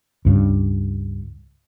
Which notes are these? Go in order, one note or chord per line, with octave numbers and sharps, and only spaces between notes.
C#2 G2